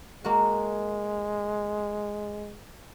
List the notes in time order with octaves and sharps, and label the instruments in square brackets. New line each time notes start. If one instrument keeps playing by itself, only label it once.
[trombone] G#3 [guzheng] A#3 F#4